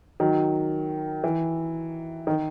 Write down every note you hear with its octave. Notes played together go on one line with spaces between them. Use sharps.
D#3 F#3
E3
D#3